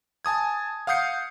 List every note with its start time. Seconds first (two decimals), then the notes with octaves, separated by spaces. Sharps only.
0.25 G#5 A5 D#6 G#6
0.87 F5 F#5 D#6 G6 C7 C#7